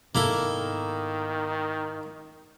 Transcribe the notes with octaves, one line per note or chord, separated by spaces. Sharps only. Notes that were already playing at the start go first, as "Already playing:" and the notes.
G#2 D#3 A#3 B3 E4 A4